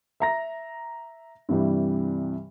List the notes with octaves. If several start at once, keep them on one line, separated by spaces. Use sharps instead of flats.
E5 A#5 A#6
G2 C3 E3 G3